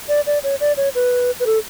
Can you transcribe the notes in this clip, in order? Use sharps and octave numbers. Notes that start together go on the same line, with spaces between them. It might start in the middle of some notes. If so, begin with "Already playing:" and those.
D5
D5
C#5
D5
C#5
B4
B4
A4